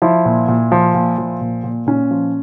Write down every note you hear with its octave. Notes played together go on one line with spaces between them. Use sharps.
F3 E4
A#2
A#2
F3
A#2
F3
A#2
A#2
A#2 C#4
F3